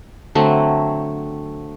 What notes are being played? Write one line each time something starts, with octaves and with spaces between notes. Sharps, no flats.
D3 F#3 A3 C4